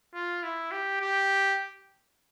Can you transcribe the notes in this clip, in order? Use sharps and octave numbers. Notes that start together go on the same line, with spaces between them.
F4
E4
G4
G4